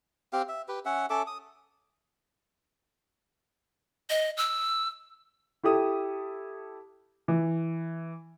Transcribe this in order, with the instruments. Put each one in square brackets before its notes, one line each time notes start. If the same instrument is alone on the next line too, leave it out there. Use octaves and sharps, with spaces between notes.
[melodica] C4 G4 F5
E5
G4 B4
C#4 E5 F#5
C#4 A4 E5 D6
D#6
[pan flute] D#5
E6
[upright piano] E4 G4 A4 D#6
E3